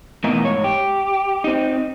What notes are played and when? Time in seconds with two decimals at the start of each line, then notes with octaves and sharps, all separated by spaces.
0.24 E2 B2 E3 A3 A#3 D#4
0.44 G#2 C#5
0.64 G4
1.44 C4 D#4